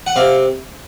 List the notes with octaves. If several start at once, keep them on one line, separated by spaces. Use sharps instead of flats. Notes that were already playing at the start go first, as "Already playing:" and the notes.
F#5
C3 F5